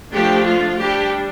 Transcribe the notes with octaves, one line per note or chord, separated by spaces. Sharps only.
F3 A3 D4 G4
F4
G3 D4 G4